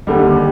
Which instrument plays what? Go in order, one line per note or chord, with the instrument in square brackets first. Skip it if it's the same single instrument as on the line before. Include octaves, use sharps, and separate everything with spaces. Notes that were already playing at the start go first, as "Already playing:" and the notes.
[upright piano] D#2 D3 G3